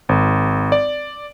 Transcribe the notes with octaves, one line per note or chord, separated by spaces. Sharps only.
G#1
D5